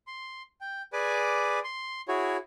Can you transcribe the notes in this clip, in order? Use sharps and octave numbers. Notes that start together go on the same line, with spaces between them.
C6
G5
G#4 B4 D5 G#5 D6
C6
E4 F#4 G#4 C#5